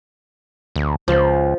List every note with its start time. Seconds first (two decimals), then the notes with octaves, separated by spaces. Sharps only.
0.76 D2
1.08 C#2 F3